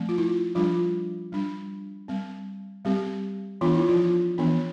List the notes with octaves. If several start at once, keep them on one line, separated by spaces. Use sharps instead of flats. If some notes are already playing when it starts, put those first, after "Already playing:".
Already playing: F3 A3 C4
F4
E4
F3 G3 D4 F4
G3 D4
G3 C4
G3 C4 G4
E3 B3 D4 F4
E4
F3 F4
E3 B3 D4